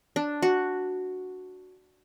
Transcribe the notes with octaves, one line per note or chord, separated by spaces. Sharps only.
D4
F#4